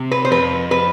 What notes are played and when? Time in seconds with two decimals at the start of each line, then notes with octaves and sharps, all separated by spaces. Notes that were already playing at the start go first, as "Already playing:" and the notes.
Already playing: C3
0.11 B4
0.25 C5
0.31 F2 B4
0.71 B4